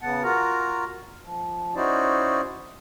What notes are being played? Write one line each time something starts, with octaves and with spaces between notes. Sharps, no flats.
C#3 B3 F#5 A5
F4 F#4 A#4 A#5
F3
C#4 D#4 E4 F#4 C5 D5